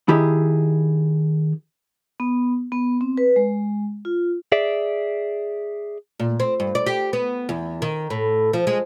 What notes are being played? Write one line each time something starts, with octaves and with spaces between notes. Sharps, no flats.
D#3 E4 G4 G#4
B3
B3
C4
B4
G#3
F4
G#4 D5 E5
A#2
C4
G2
D5
G4
B3
E2
D#3
A2
F3
G#3